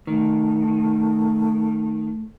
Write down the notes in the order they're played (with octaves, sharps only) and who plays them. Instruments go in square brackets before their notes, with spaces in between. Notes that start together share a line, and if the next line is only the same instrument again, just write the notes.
[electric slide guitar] D#3 [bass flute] A3